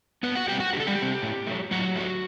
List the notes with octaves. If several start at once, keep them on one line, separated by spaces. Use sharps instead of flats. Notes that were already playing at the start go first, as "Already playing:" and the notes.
D3 B3 B4
F#4 F#5
G3 C4 G4 G5
F#4 F#5
D3 G4
A4
G3 G4
G3 C4
A2
F#3 A3
A2 F#3 F#4
F#3 A3